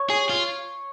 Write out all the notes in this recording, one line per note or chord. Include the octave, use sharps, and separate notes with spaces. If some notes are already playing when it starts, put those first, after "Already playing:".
Already playing: C#5
G#4
F4